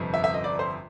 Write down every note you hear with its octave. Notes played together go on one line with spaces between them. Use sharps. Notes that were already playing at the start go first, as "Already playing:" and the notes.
Already playing: G1 F2 C3
E5
E5
D#5
D5
C5